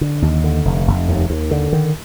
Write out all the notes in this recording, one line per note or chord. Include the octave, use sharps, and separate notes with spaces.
D3
D#2
D3
F1
F1
D#2
D#2
D3
D#3